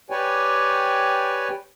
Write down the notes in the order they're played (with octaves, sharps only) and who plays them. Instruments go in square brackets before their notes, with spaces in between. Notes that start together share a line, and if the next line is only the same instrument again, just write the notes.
[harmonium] G4 B4 C#5 D5 G5 G#5